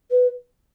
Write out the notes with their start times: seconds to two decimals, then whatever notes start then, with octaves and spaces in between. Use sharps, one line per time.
0.11 B4